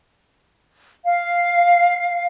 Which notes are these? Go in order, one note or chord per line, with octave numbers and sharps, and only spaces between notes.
F5